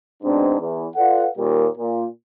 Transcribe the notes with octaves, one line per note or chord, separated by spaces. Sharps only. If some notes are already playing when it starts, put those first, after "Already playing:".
G#2 B2 C4 D4
E2
F4 A4 B4 D5 F5 F#5
D#2 A#2 G3 A#4
A#2